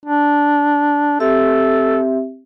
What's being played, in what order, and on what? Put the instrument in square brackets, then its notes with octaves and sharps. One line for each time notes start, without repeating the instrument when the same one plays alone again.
[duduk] D4
[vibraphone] C4 G4 E5 [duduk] A4